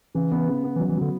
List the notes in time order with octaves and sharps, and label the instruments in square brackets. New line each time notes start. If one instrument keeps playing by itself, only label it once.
[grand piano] C#3 [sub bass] E3
[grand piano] B3
C#3
B3
[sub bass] E3
[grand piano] F#3
[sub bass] E3
[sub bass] D3 [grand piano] F#3